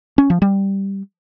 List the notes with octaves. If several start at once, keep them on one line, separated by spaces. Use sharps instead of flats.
C#4
F3
G3